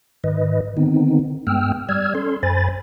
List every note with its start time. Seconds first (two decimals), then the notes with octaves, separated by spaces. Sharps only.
0.24 G#2 D#3 B4 D#5
0.77 D3 D#3 B3 C4 D#4
1.47 G2 G#3 B3 G5 E6 F6
1.89 G3 D5 E6 F6 G#6
2.15 C#4 A4 C6
2.43 F#2 C5 G#5 B5 A6